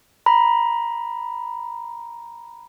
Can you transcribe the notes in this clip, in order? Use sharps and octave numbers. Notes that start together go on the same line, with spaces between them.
A#5 B5